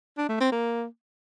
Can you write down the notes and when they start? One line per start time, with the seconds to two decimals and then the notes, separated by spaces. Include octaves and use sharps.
0.17 D4
0.29 A3
0.40 C4
0.52 A#3